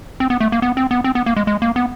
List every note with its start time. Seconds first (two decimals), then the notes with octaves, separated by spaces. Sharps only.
0.20 C4
0.30 B3
0.40 A3
0.52 A#3
0.62 B3
0.77 C4
0.91 B3
1.04 C4
1.15 B3
1.26 A#3
1.37 G#3
1.47 G#3
1.62 A#3
1.76 B3